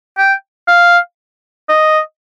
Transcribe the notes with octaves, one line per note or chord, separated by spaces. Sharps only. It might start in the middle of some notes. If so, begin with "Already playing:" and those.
G5
F5
D#5